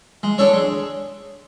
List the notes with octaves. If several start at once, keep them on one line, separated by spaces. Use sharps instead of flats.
G#3
D4 A4 C#5
G#3